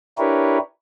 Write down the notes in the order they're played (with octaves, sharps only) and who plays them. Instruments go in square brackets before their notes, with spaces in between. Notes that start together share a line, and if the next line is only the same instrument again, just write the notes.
[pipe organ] D4 E4 G4 A#4 B4 C#5